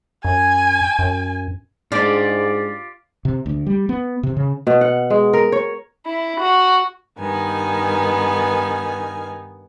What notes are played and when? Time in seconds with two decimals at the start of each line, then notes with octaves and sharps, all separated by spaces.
0.25 F#2 G#5
0.99 F#2
1.92 G#2 G#3 D4 F4 G4 D5
3.25 C3
3.46 D2
3.67 G3
3.89 B3
4.23 C3
4.37 C#3
4.67 B2
4.81 F#5
5.10 G#3
5.33 A#4
5.52 C#5
6.06 E4
6.40 F#4
7.19 G2 D#3 B3 D#4 G#5